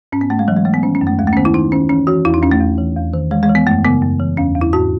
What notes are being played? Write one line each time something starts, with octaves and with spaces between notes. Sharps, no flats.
G#2 C#4
B3
G#2 A3
G#3
E3 F#3
G#3
E3 A3
B3
D#3 C#4
C#4
F#2
A3
D#2 G#3
A3
C#4
D#3 B3
E4
D#3 D#4
D#3 C#4
E3 C#4
E3 F#4
E2 E4
D#4
E2 C#4
A3
E2
E3
E2
D#3
E3 G#3
G#3
E3
B3
F#2 A3
C#3 B3
F#2
E3
E2 C#4
E2
E4
G#2 F#4